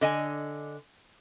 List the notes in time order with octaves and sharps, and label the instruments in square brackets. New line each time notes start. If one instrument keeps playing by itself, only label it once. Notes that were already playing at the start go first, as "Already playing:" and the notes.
[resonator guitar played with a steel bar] D3 D#5 G#5